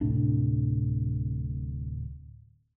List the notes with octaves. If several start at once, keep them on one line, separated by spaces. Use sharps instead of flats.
D1 A2 C3 D4